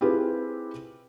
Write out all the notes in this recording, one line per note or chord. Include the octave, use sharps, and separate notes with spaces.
C4 E4 F4 G4 G#4 B4